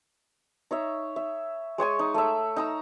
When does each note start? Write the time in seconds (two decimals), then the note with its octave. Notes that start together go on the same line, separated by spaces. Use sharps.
0.71 D#4 C#5 E5
1.16 E5
1.78 G#3 C#5 G#5 C#6
1.99 D#4
2.14 A3 E5
2.56 D#4 A#5 E6